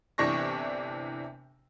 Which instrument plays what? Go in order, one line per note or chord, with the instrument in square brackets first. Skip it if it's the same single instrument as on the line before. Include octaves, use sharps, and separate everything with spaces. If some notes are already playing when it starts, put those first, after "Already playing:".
[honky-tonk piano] G1 C3 E3 D4 C#6 A#6